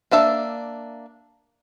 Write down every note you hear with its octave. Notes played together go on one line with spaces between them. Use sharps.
A#3 D4 E5 A5